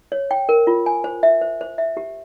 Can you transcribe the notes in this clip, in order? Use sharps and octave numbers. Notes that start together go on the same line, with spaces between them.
C#5
G5
A#4
F4
G#5
C5
E5
C5
C5
E5
G4